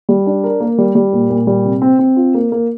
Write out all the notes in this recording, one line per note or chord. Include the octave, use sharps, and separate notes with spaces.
G3
D4
A#4
A#3
G3
G3
A#2
A#2
G3
C3
C4
C4
F4
A#3
A#3